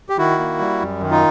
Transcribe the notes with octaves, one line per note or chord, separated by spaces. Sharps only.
G4
D#3 E4 F#4
A#3
G3
F#2
D#3
D#4 F4